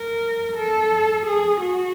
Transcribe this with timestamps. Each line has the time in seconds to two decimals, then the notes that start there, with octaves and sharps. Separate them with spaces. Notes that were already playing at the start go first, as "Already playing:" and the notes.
Already playing: A#4
0.56 A4
1.26 G#4
1.61 F#4